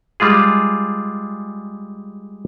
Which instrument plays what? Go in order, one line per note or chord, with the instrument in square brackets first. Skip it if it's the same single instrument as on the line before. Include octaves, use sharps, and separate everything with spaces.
[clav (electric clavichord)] G3 G#3 F4 G#4